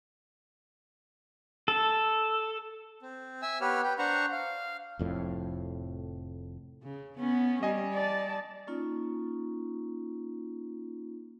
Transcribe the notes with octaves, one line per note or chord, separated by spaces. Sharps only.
A4
C4
E5 G#5 E6
B3 G4 B4 C#5 F6
B4 G5
D4 C5 F#5 A#5 C#6
F5
F1 F2 A2
C#3
B3 C#4
G3 D#5 G#5
D5 A5
A#3 C#4 D#4 F4